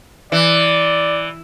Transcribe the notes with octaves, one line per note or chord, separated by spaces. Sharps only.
E3 D5